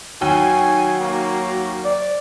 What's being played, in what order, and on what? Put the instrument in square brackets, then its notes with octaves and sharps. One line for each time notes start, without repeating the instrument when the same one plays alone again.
[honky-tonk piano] D#2 [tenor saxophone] F#3 [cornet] G#5
[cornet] A#3
[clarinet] D5